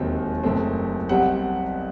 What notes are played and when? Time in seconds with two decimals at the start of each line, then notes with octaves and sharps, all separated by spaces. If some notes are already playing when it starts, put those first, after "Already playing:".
Already playing: E1 D#2 D#3 F#3 C4
0.44 F#1 E2 B2 A3 C4
1.09 B1 B2 G3 C4 F#5